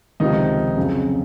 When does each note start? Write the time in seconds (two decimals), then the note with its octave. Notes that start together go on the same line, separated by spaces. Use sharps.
0.20 C#2 C3 D#3 F3 D#4
0.77 F2 C#3 F#3